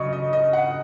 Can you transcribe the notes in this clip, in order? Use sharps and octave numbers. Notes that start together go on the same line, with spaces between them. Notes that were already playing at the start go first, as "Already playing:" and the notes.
Already playing: C#3 F#3 D#5 C#6
D#5
D#5
F#5